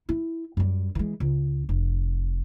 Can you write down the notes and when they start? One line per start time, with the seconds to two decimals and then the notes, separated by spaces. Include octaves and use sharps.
0.09 E4
0.57 F#2 G3
0.95 E3 G#3
1.20 C#2
1.69 F1